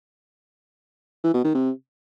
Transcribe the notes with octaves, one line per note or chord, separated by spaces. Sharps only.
E3
B2
D#3
C3